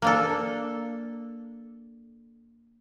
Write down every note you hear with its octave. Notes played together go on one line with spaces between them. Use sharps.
A#3 D4 A4